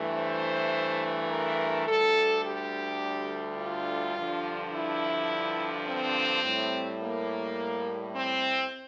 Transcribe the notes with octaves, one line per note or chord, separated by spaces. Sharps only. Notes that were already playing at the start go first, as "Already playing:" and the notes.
Already playing: G2 E3 A3
C5
A#4
D2 D3 G3 A4
G4
F4
G2 D3 F3
E4
C4
A2 G3
A#3
C4